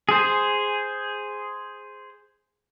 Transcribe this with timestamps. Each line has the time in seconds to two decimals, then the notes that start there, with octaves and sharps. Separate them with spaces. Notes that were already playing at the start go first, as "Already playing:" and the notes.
0.09 G#4 C5